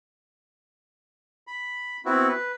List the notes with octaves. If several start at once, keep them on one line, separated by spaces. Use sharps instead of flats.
B5
B3 C4 E4 F#4
B4